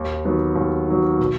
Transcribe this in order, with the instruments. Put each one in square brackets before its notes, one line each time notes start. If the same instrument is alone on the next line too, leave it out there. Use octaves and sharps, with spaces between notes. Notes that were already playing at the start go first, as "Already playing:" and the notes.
Already playing: [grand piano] D#2
D#3 F#3 B3
D#2
D#3 F#3 B3
B2